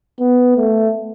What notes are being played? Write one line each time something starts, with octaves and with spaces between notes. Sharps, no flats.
B3
A3